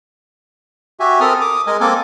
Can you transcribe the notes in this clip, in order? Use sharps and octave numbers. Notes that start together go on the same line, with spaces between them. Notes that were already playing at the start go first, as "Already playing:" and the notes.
F#4 G4 E5 G#5
C4 A4 A#4 D#6 F6
D6 D#6
G#3 A#4 D#5 G#5
A#3 C4 A4 A#4 G#5 D6